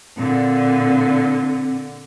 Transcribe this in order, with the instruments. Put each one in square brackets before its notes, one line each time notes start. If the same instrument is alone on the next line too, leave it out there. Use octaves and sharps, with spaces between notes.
[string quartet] A#2 D3 [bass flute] C4